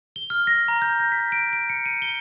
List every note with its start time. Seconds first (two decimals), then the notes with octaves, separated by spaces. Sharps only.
0.16 G7
0.30 F6
0.47 A#6
0.68 A#5
0.82 G6
1.00 A#6
1.12 B6
1.32 D7
1.53 D7
1.70 C#7
1.86 D#7
2.02 G7